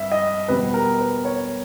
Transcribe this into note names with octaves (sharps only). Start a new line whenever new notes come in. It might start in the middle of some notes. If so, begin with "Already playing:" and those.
Already playing: G2 E5
D#5
E2 B2 G3 B4
A#4
B4
C#5